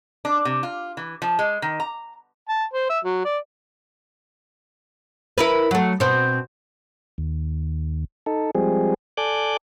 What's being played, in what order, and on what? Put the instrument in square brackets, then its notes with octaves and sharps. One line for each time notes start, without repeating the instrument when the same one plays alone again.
[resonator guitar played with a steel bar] D4
C3
F4
E3
F3
G#3
D#3
A#5
[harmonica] A5
C5
E5
F#3
D5
[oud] E4 A#4 B4
F#3 A3
B2 C4
[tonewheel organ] D#2
D#4 A4
F3 G3 G#3 C4 G#4
A4 D5 G#5 D6 F#6 G6